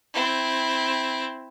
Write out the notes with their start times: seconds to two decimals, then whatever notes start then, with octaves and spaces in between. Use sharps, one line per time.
0.14 C4 E4